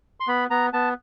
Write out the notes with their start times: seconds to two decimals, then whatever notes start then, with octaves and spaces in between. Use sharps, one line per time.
0.20 C6
0.28 B3 B5
0.51 B3 A#5
0.73 B3 A5